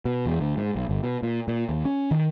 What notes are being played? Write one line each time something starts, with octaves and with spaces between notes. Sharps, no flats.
B2
E2
D2
G#2
B1
G1
B2
A#2
A#2
D#2
C#4
D#3